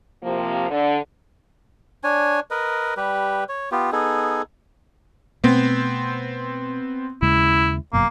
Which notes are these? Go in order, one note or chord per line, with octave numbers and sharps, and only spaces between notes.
C3 F3 A#3
D3
D4 C#5 G#5
A#4 B4 D#5
G3 G4 B4
C#5
B3 F4 G4
B3 D#4 G#4 A4
B2 A3 B3 C4
D#2 C#3 G#3 E4
G1 F#2 B2 A#3